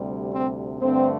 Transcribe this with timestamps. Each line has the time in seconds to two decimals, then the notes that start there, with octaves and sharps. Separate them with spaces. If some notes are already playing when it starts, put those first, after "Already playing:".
Already playing: D2 C3 G3
0.33 C4
0.81 G2 D3 A3 C4